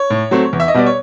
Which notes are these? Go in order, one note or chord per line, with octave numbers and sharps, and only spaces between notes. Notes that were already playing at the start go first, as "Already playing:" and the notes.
Already playing: C#5
A2
F#3 A3 C4
E2
E5
D#5
B2 G3 B3 D5
C#5